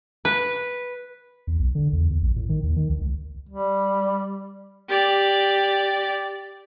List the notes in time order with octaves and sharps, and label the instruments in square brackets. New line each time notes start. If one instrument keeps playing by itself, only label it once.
[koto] B4
[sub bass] E2
B1
D3
E2
E2
A#1
A2
D#3
D#2
D#3
D2
C#2
[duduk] G3
[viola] G4 D5